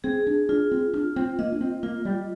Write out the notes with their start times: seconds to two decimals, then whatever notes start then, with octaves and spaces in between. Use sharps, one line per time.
0.04 C4 G#4
0.27 D4
0.49 D4 F4
0.71 C4
0.93 D4 F4
1.16 C4
1.39 A#3 D#5
1.52 D4
1.61 C4
1.83 A#3 F4
2.05 G3